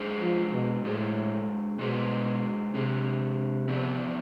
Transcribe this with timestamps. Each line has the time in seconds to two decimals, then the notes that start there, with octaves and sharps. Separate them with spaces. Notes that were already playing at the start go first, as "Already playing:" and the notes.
Already playing: G#3 D4 G#4 C5
0.21 F3
0.52 B2
0.84 A2 G#3 D4 G#4 C5
1.79 B2 G#3 D4 G#4 C5
2.74 C3 G#3 D4 G#4 C5
3.69 D3 F3 B3 D4